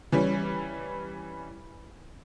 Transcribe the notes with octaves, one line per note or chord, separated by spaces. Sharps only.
E3 G3 C#4